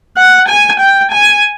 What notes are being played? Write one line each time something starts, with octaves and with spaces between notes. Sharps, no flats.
F#5
G#5
G5
G#5